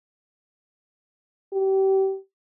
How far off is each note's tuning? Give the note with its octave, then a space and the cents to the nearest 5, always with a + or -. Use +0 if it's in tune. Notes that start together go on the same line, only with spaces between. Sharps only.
G4 -30